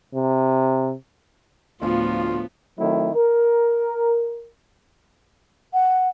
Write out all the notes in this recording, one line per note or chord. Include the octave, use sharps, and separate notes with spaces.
C3
D2 A2 F3 B3 F4
D#3 F#3 A3 C4 E4
A#4
F#5